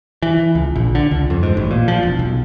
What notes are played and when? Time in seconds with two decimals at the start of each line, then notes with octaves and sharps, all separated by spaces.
0.22 E3
0.55 C#2
0.76 A#1
0.95 D3
1.11 C#2
1.30 F2
1.43 G#2
1.57 A1
1.71 A#2
1.88 F3
2.03 E1
2.19 B1